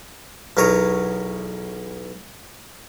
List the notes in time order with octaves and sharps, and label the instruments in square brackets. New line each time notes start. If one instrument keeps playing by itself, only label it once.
[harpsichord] B1 E2 A#4 C#5 D#6